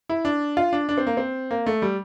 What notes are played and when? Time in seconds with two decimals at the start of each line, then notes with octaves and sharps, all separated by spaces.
0.09 E4
0.25 D4
0.57 F4
0.73 D4
0.89 D4
0.98 C4
1.07 A#3
1.17 C4
1.51 A#3
1.66 A3
1.82 G3